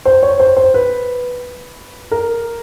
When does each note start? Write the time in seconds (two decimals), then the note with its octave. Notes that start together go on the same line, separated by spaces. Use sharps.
0.05 C5
0.23 C#5
0.40 C5
0.57 C5
0.74 B4
2.11 A#4